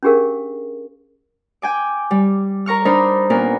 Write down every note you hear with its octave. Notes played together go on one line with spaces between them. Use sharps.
C#4 D4 G4 G#4 A#4 F5
G5 G#5 D6
G3
A#4 A#5 C#6 F6
D4 D#4 A#4 C5 B5
A#2 B3 C#4 A#4 B5